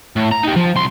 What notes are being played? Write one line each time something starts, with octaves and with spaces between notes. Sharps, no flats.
A2
A#5
D#4 G4
F3
C2 C6